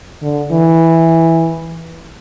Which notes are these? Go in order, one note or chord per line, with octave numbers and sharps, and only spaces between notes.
D3
E3